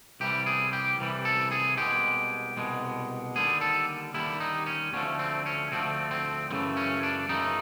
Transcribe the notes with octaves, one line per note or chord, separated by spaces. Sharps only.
C2 C3 E3 G3 G4
G#4
G4
C2 C3 E3 G3
A4
G#4
C2 B2 G#3 G4
C2 B2 G#3
D#2 D3 G3 G#4
A4
D#2 D3 G3 E4
D#4
C#4
D2 D3 F3 A3 C#4
C4
C#4
D2 D3 F3 A3 C4
C4
F#2 C#3 E3 A3 C4
C#4
D4
F#2 C#3 E3 A3 D#4